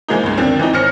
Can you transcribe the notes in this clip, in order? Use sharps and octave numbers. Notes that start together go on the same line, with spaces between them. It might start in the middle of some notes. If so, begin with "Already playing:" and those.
E3 F3 G#3 A#3 D#4
C#2 G2
D#2 D3 D#3 F3 C4
E3 C4 D#4
G#1 C#4 C5 F6 A#6 C#7